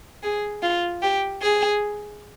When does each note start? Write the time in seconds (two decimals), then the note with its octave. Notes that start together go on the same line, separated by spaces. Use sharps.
0.23 G#4
0.62 F4
1.02 G4
1.42 G#4